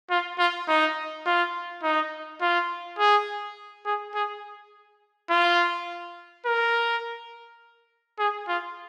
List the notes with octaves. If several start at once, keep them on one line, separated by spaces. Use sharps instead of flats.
F4
F4
D#4
F4
D#4
F4
G#4
G#4
G#4
F4
A#4
G#4
F4